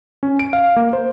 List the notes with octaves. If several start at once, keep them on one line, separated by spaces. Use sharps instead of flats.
C#4
D7
F5
A#3
C5